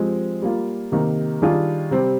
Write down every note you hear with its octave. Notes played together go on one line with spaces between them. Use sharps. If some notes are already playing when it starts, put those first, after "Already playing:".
Already playing: F3 G#3 C4 G4
G3 A#3 F4
C3 D#3 A#3 D#4
D#3 G3 D4 F4 G#4
C3 G3 C4